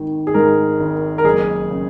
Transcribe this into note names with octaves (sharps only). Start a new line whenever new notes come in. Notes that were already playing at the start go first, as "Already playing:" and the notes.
Already playing: G#1 D#3
G#4
G#2 A#4
G#1
A#4
F#1 G#4
C#3